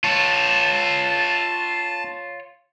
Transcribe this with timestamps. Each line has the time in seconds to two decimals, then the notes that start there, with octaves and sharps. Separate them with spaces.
0.04 F4 C#5 A5